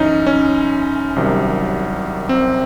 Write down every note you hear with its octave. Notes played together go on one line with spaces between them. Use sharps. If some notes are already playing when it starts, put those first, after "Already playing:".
Already playing: F#2 E3 C#4 D#4
C#4
C2 C3 D#3 F#3
C4